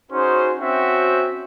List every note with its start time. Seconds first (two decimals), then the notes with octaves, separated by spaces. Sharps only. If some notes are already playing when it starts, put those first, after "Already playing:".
0.11 C#4 D#4 F#4 G#4 C5
0.59 C4 C#4 F#4 C5 E5 G5